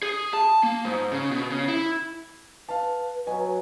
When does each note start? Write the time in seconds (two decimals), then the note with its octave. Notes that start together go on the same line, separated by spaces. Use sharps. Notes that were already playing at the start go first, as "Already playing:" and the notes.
0.03 G#4
0.33 A5
0.63 A#3
0.85 G#2
1.12 C#3
1.31 B2
1.50 C#3
1.68 E4
2.69 B4 F5 A5
3.27 B2 F#3 G#5